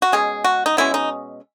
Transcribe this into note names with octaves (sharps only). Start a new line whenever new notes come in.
F#4
B2 G#3 C#4 G#4
F#4
D#4
B2 G#3 C#4 E4
D#4